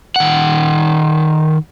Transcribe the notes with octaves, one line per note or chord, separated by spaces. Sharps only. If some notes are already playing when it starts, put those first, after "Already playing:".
D#3 F#5